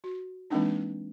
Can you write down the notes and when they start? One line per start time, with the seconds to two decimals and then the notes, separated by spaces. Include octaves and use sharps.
0.04 F#4
0.50 E3 G#3 A#3 C4 D4 D#4